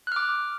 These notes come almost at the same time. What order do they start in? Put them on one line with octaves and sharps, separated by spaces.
F#6 F6 D6